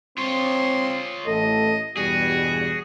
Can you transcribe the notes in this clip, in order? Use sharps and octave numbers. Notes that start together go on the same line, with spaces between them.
C4 F4 C#5 C6
A1 A3 A4 D#5
E2 G2 B2 G3 F#4 G#4